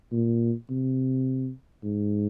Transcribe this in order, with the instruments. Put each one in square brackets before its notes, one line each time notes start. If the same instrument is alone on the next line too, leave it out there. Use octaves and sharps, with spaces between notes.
[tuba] A#2
C3
G#2